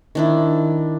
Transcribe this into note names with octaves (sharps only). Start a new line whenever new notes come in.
D#3 D4 E4